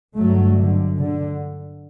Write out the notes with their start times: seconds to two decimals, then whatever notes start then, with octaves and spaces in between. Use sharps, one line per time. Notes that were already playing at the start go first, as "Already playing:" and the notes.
0.17 G1 G2 F#3 A3
0.58 D3
0.98 D3